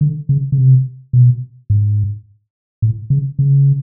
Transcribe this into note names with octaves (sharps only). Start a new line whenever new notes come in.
D3
C#3
C#3
C3
B2
G#2
A2
C#3
C#3